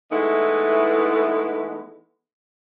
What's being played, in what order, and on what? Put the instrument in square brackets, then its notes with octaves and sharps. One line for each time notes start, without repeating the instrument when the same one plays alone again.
[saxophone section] E3 G#3 A3 B3 D#4 E4